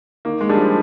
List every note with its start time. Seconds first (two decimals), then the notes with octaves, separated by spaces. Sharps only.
0.25 D#3 A#3
0.41 G#3
0.49 G3 D4 G#4
0.57 F3